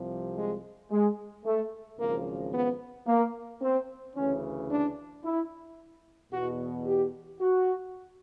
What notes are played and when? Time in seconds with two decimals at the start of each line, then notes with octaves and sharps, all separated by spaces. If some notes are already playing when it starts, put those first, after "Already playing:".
Already playing: C2 C3 F3
0.37 G#3
0.92 G#3
1.46 A3
1.99 G#1 F#2 C#3 F3 A#3
2.53 B3
3.07 A#3
3.62 C4
4.16 D2 C#3 E3 C#4
4.70 D4
5.24 E4
6.32 E2 B2 F#4
6.87 G4
7.40 F#4